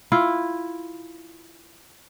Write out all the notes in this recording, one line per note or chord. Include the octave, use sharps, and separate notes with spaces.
E4 F4